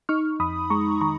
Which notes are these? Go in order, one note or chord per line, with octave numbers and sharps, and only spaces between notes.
D#4 C#6 F6
F2 B5 D#6
G#3 A#5 C#6
D#3 A#5 C#6